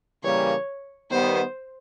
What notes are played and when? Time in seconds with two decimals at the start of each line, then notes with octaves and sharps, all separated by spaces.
0.23 C#3 E3 G3 A#3 C#5
1.10 D#3 G3 B3 C5